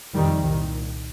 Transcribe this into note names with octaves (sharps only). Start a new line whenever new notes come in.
F2 C3 D#3 G3
C2 A#2 D#3